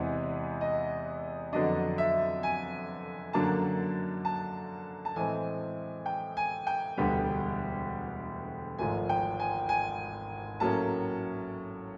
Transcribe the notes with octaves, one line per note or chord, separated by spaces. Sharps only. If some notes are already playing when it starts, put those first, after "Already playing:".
Already playing: E2 C3 E3 G#3 F#5
D#5
F2 D3 F#3 B3 D4 D#5
E5
G#5
F#2 D3 F#3 A#3 D4 A5
A5
A5
A2 E3 G#3 C4 G#5
G5
G#5
G5
E1 D2 D3 G3 B3
G#1 G#2 F3 A3 G#5
G5
G#5
G#5
A2 F#3 A#3 C#4 A5